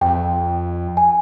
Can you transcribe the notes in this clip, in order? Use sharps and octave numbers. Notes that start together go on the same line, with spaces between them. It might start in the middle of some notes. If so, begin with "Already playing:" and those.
F2 G5
G#5